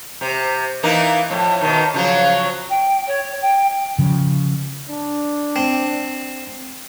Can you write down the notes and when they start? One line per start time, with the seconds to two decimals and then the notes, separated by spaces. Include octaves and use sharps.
0.21 C3
0.83 E3 A#3 D#4
1.30 F2 A2
1.61 B2 D#3
1.94 C#3 F3 F#3
2.70 G5
3.07 C#5
3.42 G5
3.98 C#3 F3
4.89 D4
5.56 C4